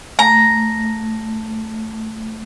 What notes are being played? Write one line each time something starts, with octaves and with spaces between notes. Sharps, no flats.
A3 A#5